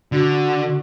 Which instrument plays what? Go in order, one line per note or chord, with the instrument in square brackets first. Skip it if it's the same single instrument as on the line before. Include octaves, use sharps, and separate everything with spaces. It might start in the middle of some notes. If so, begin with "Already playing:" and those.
[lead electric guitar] D3 [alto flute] F#4